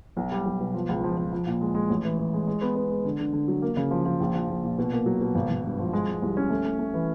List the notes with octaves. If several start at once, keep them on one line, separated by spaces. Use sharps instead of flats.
B1
G3
B1
B2
F3
C#2
F3
F3
F3
A#2
G#3
G#3
A1
E3
E3
G#3
G#3
B3
B3
G#3
D3
D3
D3
F#3
A#3
C#3
F3
F3
A#1
F3
A#1
A#2
B2
A#3
F#3
B2
G#1
G#1
G2
F3
G#3
G#3
C2
C#4
A3
A3
A3
E3